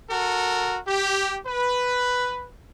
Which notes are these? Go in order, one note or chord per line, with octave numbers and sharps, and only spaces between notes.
F#4 A4 A#4
G4
B4